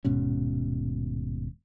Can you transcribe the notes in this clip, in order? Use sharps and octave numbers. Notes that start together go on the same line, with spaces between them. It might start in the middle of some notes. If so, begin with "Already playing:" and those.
D#1 G#2 B2 C#4